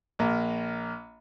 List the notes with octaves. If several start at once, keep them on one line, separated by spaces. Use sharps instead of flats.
A#1 A#3